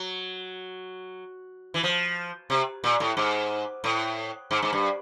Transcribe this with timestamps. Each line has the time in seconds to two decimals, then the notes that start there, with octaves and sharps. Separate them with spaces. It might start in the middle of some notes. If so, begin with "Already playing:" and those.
Already playing: F#3
1.74 E3
1.83 F3
2.50 C3
2.84 A#2
3.00 A2
3.17 G#2
3.84 A2
4.51 G#2
4.62 G#2
4.73 G2